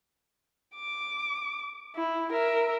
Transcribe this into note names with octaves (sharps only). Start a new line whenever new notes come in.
D6
E4
A#4 E5